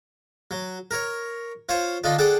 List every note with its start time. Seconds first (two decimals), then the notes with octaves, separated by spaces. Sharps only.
0.51 F#3
0.91 A#4 C#5
1.69 F4 C5 C#5
2.04 D3 D4 D#4 F4
2.18 D4 G#4 A4 F#5 G5